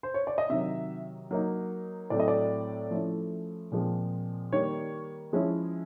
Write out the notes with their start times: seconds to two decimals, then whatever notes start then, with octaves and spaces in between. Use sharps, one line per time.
0.03 C5
0.14 C#5
0.27 D5
0.38 D#5
0.49 C3 D#3 F#3 E5
1.31 F#3 A#3 D#4
2.10 A2 F#3 A3 C4 D5
2.20 D#5
2.28 D5
2.91 F3 A3 C#4 E4
3.72 A#2 F3 G#3 C4
4.53 D#3 G3 A#3 C#5
5.33 F3 G#3 C#4 E4